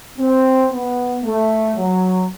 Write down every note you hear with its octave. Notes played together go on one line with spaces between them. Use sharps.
C4
B3
A3
F#3